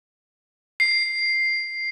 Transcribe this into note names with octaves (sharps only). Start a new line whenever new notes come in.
C7